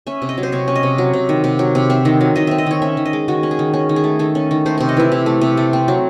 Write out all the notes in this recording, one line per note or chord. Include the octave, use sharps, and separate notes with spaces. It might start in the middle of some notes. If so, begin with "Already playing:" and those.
C#4 E5
C3
D#5
F#3
C5
C3 C#5
C#4
D#5
C3
F#3
C3
D#3
C3
F#3
C3
C4 E5
D#3
F#3
D#3 D#5
C4 E5
D#5
D#3 C#5
C#4 E5
D#3
D#5
G#3
D#3 F#4
C#4
G#4
D#3
C#4 G#4
D#3
G#4
A3
D#3 A4
C#4
D#3
A3 C5
C3 C5
D#5
E3 E4
C3
A3
C3
A3
C4
F#3